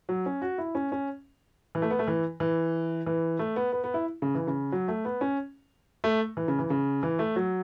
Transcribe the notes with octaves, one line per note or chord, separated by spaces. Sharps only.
F#3
C#4
F#4
E4
C#4
C#4
E3
A3
B3
A3
E3
E3
E3
A3
B3
B3
B3
E4
C#3
E3
C#3
F#3
A3
B3
C#4
A3
E3
C#3
E3
C#3
E3
A3
F#3